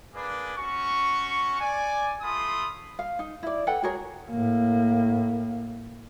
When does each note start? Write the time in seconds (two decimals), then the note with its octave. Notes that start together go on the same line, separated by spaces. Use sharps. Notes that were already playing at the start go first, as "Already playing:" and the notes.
0.13 A#3 D4 G#4 B4
0.56 C#4 F#4 C#6
1.60 D5 G#5
2.22 A3 F4 B5 C6 D#6
2.99 F5
3.19 D#4
3.43 E4 D5
3.67 A4 B4 F#5 G5
3.83 F#4 G#4 A#4 C#5
4.30 A2 A#3